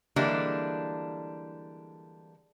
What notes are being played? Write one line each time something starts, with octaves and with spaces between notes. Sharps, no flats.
D3 E3 G3 G#3 A#3 D4